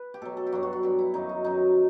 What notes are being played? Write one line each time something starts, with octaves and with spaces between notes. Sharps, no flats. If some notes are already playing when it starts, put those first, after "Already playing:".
Already playing: B4
G4
B2 F#3 A4
A4
G4
G2 F#3 F#4
F#4
F#4
G2 F#3 G4
E4
F#2 D#3 F#3 D#4
D#4
F#2 D#3 F#3 D#4